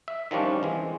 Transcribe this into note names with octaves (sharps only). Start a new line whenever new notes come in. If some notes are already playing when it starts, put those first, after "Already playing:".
E5
D#3 F3 G3 C#4 D4
E3 G#3 C4